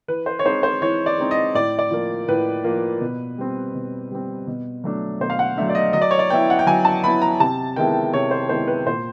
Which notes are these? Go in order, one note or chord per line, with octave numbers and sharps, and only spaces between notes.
E3 B4
C5
C#5
G#3 C4 D#4 C5
C5
E3 C#5
D5
G#3 C4 D#4
D#5
A2 D5
D5
F3 A#3
A2 B4
F3 A#3
B2
G3 C4
B2
G3 C4
B2
F#3 A3 D4
B2 C5
F5
F#5
F#3 A3 D4 E5
D5
D#5
F#3 D#5
D5
C#5
D5
B3 E4 G5
F#5
G5
F#3 G#5
A5
B3 E4 B5
A#5
C3 A5
D#3 G#3 B3 E4 G5
C3 C#5
C5
D#3 G#3 B3 E4 C5
B4
A#2 C5